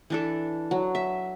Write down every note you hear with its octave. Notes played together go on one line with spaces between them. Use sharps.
E3 D4 A4
F#3
E5